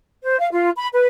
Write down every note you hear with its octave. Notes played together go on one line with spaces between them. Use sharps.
C5
F5
F4
B5
B4